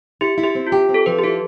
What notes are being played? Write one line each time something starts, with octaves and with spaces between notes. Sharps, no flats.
E4 G4
E4
G4
C4
F4
G4
C4
A4
F3 B4
G4
E4 A4